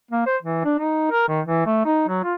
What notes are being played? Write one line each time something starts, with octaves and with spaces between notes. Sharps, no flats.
A#3
C5
E3
D4
D#4
A#4
D#3
E3
A3
D#4
F#3
F4